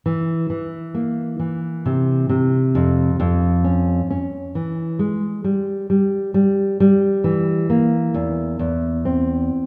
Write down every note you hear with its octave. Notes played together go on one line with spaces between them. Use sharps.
E3
E3
A#3
E3
C3
C3
F2
F2
C#4
C#4
E3
G#3
G3
G3
G3
G3
E3
A#3
E2
E2
C4